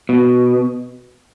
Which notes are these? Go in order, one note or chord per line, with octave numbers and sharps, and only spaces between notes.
B2